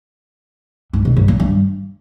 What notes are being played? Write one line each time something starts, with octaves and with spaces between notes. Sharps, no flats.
G#2
B2
G2
A#2
G2